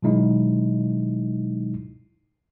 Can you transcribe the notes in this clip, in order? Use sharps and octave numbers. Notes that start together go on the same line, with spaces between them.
B2 D#3 F#3 G#3 D#4 E4